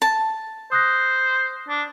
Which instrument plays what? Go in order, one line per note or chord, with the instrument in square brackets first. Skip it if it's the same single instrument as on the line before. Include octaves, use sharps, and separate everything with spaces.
[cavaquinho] A5
[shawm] C5 [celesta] D#6 F#6 A#6
[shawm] D4